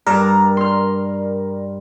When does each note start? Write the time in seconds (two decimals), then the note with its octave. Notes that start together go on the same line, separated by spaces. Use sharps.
0.06 G2 A#4 D5 A5 A#5
0.57 C6 F6